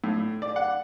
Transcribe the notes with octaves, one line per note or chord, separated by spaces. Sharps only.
A2
D5
F#5